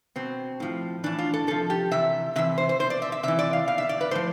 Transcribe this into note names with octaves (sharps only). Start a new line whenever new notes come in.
B2 C4
A2 F3
A2 E3 D4
F4
A4
C3 F3 A4
G4
C3 E3 E5
C3 E3 E5
C5
C5
B2 C5
D5
E5
E5
C3 E3 E5
D5
F5
B2 F5
E5
D5
B4
A2 F3 C5